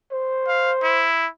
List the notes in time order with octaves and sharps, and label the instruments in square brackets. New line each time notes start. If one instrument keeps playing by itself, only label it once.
[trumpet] C5
[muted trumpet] F5
E4